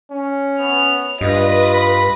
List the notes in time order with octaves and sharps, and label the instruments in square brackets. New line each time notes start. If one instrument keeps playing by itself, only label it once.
[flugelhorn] C#4
[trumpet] B3 [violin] F7
[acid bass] G2 [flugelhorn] F4 [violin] B4 A#6 [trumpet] D#5
[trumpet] B5